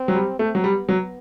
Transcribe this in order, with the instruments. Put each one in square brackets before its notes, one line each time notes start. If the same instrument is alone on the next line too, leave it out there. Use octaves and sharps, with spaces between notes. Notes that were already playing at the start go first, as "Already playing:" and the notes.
Already playing: [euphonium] C4
[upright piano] F#3
G3
[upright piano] A3 [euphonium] C4
[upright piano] F#3
G3
[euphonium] B3
[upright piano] F#3